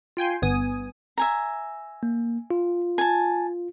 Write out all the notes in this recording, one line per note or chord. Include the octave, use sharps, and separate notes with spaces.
F4 G5 G#5 C6
G1 G2 B3 G#5 D#6
E5 G#5 A#5
A#3
F4
G#5 A5